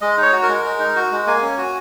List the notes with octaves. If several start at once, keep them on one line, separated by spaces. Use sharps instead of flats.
G#3 D#5
D#4
C#5
F#4
A#4
G#3
G#3
D#4
F#4
G#3
A#3 G#5
C#4
F#4